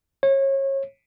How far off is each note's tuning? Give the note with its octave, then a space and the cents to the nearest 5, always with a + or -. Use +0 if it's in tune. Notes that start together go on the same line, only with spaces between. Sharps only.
C#5 -30